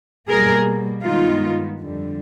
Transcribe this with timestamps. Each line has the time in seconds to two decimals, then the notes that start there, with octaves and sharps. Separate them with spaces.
0.28 B2 G3 A#3 G#4 A#4
1.03 G2 D#3 G#3 B3 D#4 F4
1.78 F2 D3 G3